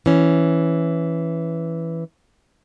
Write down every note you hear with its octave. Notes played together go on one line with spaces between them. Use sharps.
E3 C#4